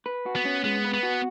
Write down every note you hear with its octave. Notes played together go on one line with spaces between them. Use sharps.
B4
F#4
B3
C#4
G#3 B3
B4
B3
F#4